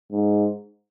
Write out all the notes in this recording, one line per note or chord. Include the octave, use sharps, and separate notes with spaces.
G#2